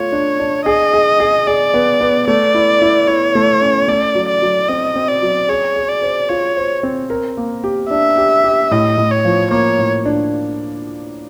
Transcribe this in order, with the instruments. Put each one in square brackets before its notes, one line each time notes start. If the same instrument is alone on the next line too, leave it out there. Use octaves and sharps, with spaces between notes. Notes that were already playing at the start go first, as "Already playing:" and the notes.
Already playing: [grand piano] A3 F4 [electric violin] C#5
[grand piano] D4
D4
[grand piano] G#4 [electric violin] D#5
[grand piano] G#4
G#4
[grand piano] G#4 [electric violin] D5
[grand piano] B3
B3
[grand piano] A3 [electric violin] D5
[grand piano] E4
E4
[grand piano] E4 [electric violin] C#5
[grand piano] A3
C#4
[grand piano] A3 [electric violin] D5
[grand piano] F#3
[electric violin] D5
[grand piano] F#3
[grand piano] C4 [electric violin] D#5
[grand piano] C4
[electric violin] D5
[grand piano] F#3
[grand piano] G#4 [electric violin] C#5
[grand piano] G#4
[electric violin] D5
[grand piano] C5
[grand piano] F4 [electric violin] C#5
[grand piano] C5
C4
A#4
A#3
G4
[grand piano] D4 [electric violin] E5
[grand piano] G4
G4
[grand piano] A2 [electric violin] D#5
[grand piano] A2
[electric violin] C#5
[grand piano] F3
[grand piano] A#3 [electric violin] C#5
[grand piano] A2
D4